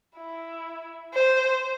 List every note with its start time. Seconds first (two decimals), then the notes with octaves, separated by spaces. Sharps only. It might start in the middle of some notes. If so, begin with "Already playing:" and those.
0.17 E4
1.14 C5